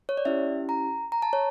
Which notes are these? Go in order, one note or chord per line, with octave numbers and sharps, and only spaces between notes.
C#5
D5
C#4 E4 G4 E5
A#5
A#5
A5
C#5